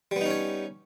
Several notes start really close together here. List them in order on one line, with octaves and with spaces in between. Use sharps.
G3 B3 D#4 C#4 C#5